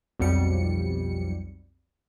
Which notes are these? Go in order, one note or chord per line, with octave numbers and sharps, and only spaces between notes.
B1 F2 G3 C#7